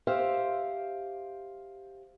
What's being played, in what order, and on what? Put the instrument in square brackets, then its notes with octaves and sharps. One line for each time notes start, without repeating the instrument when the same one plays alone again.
[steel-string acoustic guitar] G4 C5 E5 F5